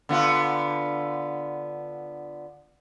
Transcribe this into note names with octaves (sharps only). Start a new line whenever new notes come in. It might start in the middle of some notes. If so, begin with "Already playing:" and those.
D3 B3 F4